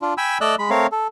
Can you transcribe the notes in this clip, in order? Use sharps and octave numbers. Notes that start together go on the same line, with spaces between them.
D4 F4
G5 G#5 B5 E6
A3 D5 D#5 E6 F#6
G#3 B5
A3 C4 A#4 C#5 F5
A4